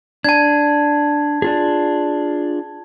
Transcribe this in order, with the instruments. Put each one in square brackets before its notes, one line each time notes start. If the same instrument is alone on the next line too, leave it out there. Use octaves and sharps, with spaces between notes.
[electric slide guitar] D4 [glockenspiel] A5 G#6
[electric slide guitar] D4 F4 G#4